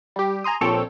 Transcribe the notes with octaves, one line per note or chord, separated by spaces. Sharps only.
G3 G4
G#5 A#5 C6 D#6
A#1 A#2 C4 A4 C#5 G5